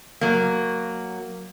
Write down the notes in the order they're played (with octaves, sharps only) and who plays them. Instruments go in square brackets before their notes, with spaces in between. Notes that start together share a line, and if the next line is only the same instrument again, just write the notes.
[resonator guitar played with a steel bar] F#3 A#3